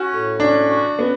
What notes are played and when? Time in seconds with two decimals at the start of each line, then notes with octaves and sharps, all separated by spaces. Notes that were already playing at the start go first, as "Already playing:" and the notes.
Already playing: C#4 F#4
0.11 A2
0.40 C#4 D4
0.69 F#4
0.98 B3 C#4